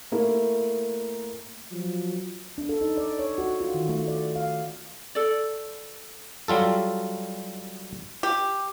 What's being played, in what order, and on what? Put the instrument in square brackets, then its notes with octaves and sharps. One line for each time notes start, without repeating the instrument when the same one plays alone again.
[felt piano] A3 A#3 E4
[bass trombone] F3 [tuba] F#3
[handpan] D4
A4
D#4
D5
C#5
F#4
F4
D#3
A3
D5
F5
[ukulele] A4 D5
[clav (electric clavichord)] F#3 G3 F4 A4
[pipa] G4